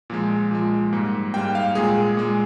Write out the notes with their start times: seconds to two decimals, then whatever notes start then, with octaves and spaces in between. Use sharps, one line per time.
0.10 A#2 F3 G#3
0.51 A#2 F3 G#3
0.93 G#2 G3 A#3
1.34 G#2 G3 A#3 G5
1.55 F5
1.75 A#2 G#3 G#4
2.17 A#2 G#3